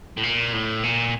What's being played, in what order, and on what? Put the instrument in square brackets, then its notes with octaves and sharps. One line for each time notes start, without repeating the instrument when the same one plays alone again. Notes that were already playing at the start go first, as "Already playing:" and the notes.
[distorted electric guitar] A2
A#2
A2
A#2